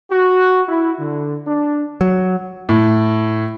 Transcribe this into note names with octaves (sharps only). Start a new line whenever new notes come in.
F#4
E4
D3
D4
F#3
A2